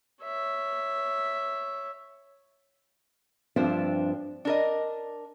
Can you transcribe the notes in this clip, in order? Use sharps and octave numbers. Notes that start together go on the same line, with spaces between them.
C#5 E5
G2 F3 C4 D4 C5 E5
D4 A#4 D#5